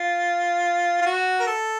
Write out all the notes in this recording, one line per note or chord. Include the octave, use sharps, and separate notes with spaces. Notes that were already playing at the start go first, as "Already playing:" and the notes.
Already playing: F4
F4
F#4
A#4
A4